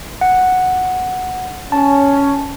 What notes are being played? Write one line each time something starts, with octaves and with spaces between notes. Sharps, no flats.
F#5
C#4 A5